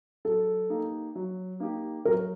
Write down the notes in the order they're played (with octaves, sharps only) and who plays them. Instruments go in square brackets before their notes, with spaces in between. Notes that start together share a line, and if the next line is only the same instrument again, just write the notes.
[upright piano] F#3 [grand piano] A4
[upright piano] A#3 D#4 G4
F#3
A#3 D#4 G4
[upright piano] F#3 [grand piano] A#4